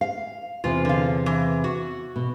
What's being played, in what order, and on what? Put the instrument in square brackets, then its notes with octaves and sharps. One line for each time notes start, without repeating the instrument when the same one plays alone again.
[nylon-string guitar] F5
[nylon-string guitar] E2 C3 [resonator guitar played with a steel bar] F4
[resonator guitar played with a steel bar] D3 F5
E3
F#4
[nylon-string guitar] B2